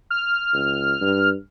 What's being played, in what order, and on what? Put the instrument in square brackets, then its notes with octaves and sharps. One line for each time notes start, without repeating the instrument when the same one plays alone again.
[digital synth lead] F6
[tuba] C#2
G2